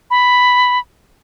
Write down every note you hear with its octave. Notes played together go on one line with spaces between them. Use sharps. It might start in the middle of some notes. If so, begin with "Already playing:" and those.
B5